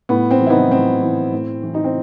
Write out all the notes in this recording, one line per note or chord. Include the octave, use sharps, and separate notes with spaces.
A2 B3
C4
E3
E4
B3 D#4
A2 C4
E3
A2
E3
D#4
C4